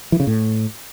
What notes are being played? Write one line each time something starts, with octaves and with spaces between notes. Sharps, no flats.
E3
C#3
A2